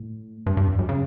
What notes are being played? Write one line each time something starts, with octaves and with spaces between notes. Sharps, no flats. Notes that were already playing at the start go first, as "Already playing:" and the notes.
Already playing: A2
G2
G2
E2
F#2
C#3